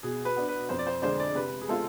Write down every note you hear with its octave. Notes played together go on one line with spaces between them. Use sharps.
B2 G#4
B4
B3 D4
B4
F2 C5
D5
C5
D3 G#3 D4 C5
D5
C3 B4
G#4
G#3 C4 F4 A4